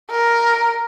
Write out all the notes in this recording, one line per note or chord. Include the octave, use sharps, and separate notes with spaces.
A#4